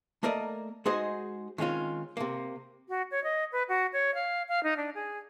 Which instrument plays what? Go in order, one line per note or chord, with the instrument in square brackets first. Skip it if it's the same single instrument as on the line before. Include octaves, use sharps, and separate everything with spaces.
[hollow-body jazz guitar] A3 A#3 A#4 D5 D#5
G#3 D#4 F#4 G#4 C5 D#5
D#3 G#3 C4 C#4 F4
C3 A#3
[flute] F#4
C#5
D#5
B4
F#4
C#5
F5
F5
D#4
D4
G#4